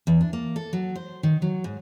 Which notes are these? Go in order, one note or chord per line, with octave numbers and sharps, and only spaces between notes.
E2
D4
A#3
A4
F#3
C5
D#3
F#3
G#2